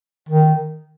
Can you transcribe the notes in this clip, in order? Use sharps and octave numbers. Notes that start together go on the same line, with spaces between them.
D#3